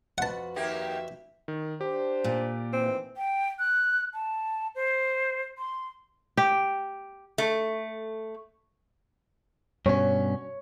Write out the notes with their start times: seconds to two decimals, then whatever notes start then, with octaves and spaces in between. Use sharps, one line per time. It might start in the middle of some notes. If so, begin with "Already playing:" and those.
0.18 F2 F#4 B4 F#5 A5
0.56 D#2 A#3 G4 E5
1.48 D#3
1.81 D4 G4 C5
2.24 A#2
2.73 D#2 E3 C4
3.17 G5
3.59 F#6
4.14 A5
4.75 C5
5.58 C6
6.37 G4
7.38 A3
9.86 G2 B2 C#4 C#5